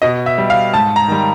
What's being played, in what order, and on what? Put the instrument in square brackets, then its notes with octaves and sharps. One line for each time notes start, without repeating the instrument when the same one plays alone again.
[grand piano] B2 D#5
E5
G3
F5
G#2 A5
A#5
D#3 G3